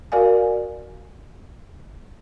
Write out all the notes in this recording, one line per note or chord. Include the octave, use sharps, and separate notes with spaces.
F#4 A#4 D5 F5 G#5